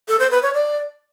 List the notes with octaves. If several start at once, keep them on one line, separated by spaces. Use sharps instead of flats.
A4
C5
B4
C#5
D5